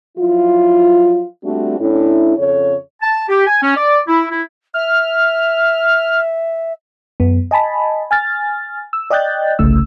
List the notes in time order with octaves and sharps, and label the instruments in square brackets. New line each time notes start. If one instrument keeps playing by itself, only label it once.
[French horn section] F3 F#3 E4 F4
G3 A3 C4 D4 F4 F#4
A2 C#4 D4 E4
F2 C#3 A4 C#5
[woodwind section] A5
G4
G#5
C#4
D5
E4
E4
[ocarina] E5 [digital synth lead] F6
[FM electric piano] F#2 B3
D#5 G#5 A5 B5
G#5 F6 A6
E6
D5 D#5 G5 F#6 G6 A6
G1 C2 C#3 A3 E6